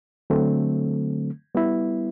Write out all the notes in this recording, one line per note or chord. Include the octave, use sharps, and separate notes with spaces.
D3 F#3 A3 C4
G3 B3 E4